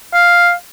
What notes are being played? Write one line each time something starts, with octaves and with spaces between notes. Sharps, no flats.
F5